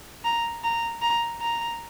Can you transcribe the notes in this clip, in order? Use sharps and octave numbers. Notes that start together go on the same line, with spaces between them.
A#5
A#5
A#5
A#5